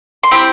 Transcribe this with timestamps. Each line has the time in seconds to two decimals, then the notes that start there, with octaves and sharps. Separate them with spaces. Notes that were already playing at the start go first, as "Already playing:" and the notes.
0.23 C6
0.31 C4 E4 G4 B5